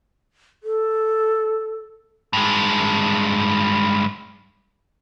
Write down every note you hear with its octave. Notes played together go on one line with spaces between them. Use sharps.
A4
G2 G#3